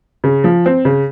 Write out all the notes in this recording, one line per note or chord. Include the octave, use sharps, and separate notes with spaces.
C#3
F3
C4
C#3